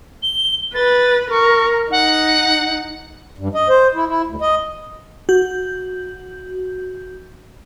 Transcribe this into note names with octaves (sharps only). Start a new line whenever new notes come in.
G7
B4 A6
A#4 C#6
D#4 F#5
G2
D#5
C5
E4
E4
D2
D#5
F#4 G6